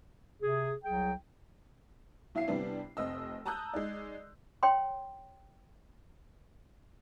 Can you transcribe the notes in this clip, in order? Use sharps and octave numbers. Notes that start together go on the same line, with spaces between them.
C3 G#4
C2 F#3 G#4 G5
B1 E4 E5 F5 C7
C3 E3 G3 B3 C4 D4
F1 C4 D#5 E6
A5 A#5 D#6 E6 F#6 G6
G#3 D#4 D5
C#5 G5 C6